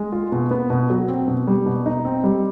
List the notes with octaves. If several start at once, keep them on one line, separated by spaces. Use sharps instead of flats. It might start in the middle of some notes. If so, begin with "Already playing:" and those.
Already playing: G#3
F4
B2
B3
B2
F#3
C4
B2
G3
B2
D#4
C4
G3